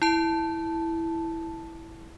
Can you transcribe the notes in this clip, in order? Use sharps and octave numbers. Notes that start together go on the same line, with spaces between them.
E4 A5